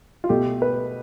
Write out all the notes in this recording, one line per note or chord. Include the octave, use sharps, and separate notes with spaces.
F4
B2 A3 G4
B4